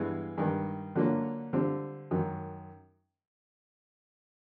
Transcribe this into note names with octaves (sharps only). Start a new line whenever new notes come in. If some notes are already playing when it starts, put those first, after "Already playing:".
Already playing: G2 E3 G#3 B3
G2 D#3 G3
D3 F#3 A#3 C#4 F4
D3 G3 C4 F4
F#2 D#3 F#3